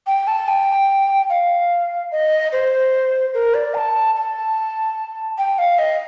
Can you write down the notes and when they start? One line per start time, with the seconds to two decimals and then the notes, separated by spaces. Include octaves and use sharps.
0.07 G5
0.27 A5
0.48 G5
1.30 F5
2.12 D#5
2.52 C5
3.34 A#4
3.54 D5
3.74 A#5
3.78 A5
4.16 A5
5.38 G5
5.58 F5
5.78 D#5